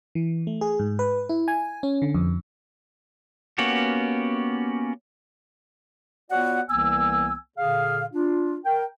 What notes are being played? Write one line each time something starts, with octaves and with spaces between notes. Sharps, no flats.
E3
A3
G#4
G#2
B4
E4
G#5
C#4
D3
F2
A#3 B3 C#4 F#4 G4
B3 F4 F#4 C#5 D5 F#5
C2 E3 A#3 B3 G#5 E6
A#2 D3 G#4 F5
D4 F4
A#4 G5